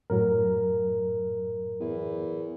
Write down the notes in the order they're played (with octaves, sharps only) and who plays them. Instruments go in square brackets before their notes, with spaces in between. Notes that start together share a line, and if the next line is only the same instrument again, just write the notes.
[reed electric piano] F#2 A2 F#3 [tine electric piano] A#4
[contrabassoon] E2